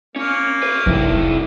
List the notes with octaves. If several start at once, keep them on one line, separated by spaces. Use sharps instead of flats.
A#3 C#4
B4 C#5
F1 G2 D#4 E4